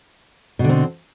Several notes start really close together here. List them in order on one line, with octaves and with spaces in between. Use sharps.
B2 D3 C4